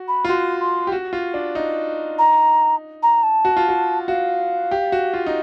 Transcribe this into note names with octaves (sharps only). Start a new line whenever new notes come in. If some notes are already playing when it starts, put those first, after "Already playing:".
Already playing: F#4
B5
F4
F#4 C6
C6
G4
F#4
F4
D4
D#4
A#5
A#5
A5
F#4
F4
F#4
F#4 F5
G4
F#4
F4
D#4